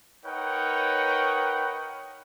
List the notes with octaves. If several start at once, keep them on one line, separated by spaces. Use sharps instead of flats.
D#4 A#4 B4 C#5 F#5 G5